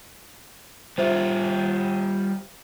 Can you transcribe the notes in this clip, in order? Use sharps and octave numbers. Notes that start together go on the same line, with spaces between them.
G3 F4 G4 C5 E5